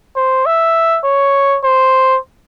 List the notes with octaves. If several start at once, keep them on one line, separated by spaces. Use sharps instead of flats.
C5
E5
C#5
C5